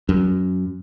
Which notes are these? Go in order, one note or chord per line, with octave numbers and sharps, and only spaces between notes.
F#2